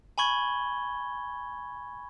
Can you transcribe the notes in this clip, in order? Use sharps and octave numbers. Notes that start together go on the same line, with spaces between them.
G#5 B5 C#6 G#6 G7